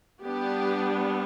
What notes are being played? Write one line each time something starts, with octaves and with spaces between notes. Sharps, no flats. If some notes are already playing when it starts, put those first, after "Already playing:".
G3 B3 D4 G4